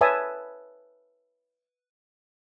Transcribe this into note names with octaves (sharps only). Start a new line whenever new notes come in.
B4 C#5 E5 G#5 A5 D#6